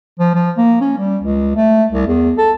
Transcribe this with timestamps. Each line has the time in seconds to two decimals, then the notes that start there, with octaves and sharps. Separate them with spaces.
0.19 F3
0.35 F3
0.57 A#3
0.81 C#4
0.98 G3
1.23 C#2
1.56 A3
1.92 C2
2.07 E2
2.38 A4